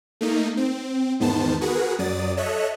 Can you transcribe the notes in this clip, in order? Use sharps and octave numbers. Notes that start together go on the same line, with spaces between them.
A3 A#3 D#4
C4
E2 G#2 D#3 B3 C5 A5
F#4 G#4 A#4 B4 F#5
F#2 F#3 D5 D#6 A6
A4 C#5 D#5 E5 F#6